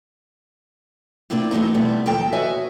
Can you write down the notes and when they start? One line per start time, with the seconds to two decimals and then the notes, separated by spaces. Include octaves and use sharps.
1.30 A2 C3 A#3 C4 D4 F4
1.51 E3 F#3 A3 C4 D#4
1.74 B2 G3 A3 B3 C4
2.06 D#2 F3 F#3 A4 G5 A#5
2.33 F#4 B4 C#5 D#5 E5 G#5